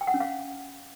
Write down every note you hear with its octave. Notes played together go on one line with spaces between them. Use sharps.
G5
F#5
C#4
F5